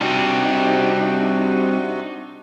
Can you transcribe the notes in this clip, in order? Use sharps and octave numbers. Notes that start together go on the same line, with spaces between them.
C3 G3 C4 D4 D#4 F#4